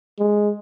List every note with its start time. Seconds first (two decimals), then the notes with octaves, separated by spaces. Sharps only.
0.19 G#3